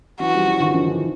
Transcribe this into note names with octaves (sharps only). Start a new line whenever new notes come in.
E3 F#3 F#4
F3 G3
E3 F#3
D#3 F3
D#3 F3
D3 E3